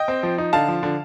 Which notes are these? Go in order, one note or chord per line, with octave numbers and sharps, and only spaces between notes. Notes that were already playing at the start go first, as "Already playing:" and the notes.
Already playing: D#5 G5
C4
F3
D#4
D3 F5 A5
F3
D3